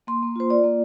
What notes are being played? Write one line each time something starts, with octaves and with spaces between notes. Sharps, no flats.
A#3 C6
A#3
F4 C5
F4 D5
A#3